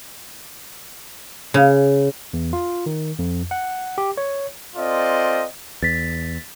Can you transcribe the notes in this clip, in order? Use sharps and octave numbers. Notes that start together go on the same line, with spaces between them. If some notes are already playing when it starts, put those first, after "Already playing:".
C#3
E2
F4
D#3
F2
F#5
G4
C#5
C4 F4 A4 D5 D#5
E2 A6 B6